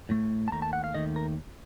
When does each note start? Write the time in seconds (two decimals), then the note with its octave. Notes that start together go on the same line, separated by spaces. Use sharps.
0.09 A2 A3
0.48 A5
0.51 D#2 D#3 A3 A#5
0.62 A5
0.73 F#5
0.84 F5
0.94 D#2 D#3 A3 D#5
1.16 A#4